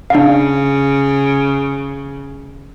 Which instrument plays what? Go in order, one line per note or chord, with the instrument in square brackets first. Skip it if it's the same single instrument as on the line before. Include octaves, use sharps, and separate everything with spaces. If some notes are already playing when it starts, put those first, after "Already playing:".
[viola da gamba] C#3 [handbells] D4 F5